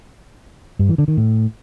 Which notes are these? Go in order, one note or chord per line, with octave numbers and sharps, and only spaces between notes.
G2
E3
D3
D#3
A2